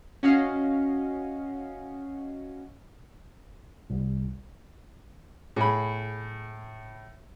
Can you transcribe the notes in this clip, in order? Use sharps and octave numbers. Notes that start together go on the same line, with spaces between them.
C#4 F#4 D#5 F5
C2
A2 G#4 B5